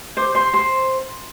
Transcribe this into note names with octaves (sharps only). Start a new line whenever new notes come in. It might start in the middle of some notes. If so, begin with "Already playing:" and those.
C5 D6
C5 C6
C5 C6